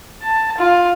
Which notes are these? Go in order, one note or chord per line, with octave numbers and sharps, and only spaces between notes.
A5
F4